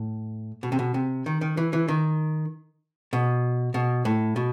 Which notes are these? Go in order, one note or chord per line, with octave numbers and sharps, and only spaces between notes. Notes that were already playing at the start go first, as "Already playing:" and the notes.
Already playing: A2
B2
C3
B2
C3
D#3
D#3
E3
E3
D#3
B2
B2
A2
B2